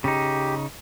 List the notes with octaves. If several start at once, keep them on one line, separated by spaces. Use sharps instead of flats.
C#3 D#4 G4